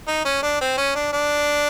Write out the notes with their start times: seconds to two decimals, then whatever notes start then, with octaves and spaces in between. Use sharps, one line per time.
0.08 D#4
0.25 C#4
0.43 D4
0.61 C4
0.77 C#4
0.95 D4
1.13 D4